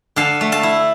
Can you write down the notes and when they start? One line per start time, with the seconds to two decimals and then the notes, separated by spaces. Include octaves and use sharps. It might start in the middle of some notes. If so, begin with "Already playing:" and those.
0.16 D3 F5 A5
0.41 A3
0.52 F5 A5
0.63 E4